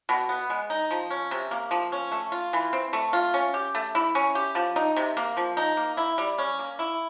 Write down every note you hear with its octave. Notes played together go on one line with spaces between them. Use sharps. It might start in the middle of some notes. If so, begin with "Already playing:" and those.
B2
B3
G#3
D#4
F3
C#4
C3
A#3
F3
C#4
A3
F4
E3
C4
A3
F4
C#4
G4
A3
E4
C#4
G4
F3
D#4
C3
A#3
F3
D#4
A#3
E4
G3
C#4
A#3
E4